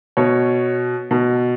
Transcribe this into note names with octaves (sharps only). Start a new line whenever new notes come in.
B2 C#5
B2